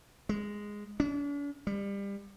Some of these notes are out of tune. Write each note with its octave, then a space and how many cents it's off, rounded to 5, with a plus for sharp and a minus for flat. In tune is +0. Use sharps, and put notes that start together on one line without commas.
G#3 -5
D4 -45
G3 +30